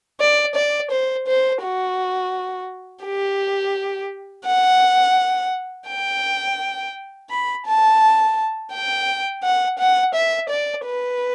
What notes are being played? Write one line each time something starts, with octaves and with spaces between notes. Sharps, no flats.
D5
D5
C5
C5
F#4
G4
F#5
G5
B5
A5
G5
F#5
F#5
E5
D5
B4